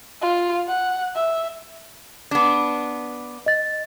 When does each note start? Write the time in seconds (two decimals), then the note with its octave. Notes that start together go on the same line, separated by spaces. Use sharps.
0.21 F4
0.68 F#5
1.15 E5
2.31 B3 D4
3.46 D#5 A6